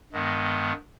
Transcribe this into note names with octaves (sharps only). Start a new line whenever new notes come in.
G2 D#3 G#3 B3